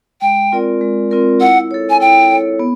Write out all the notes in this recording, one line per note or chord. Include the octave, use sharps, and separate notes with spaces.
G#3 G5
C4 F4 A#4 D5
G#3
C4 F4 A#4 D5
E4 F#5
A4 C#5
G#5
E4 G5
A4 C#5
B3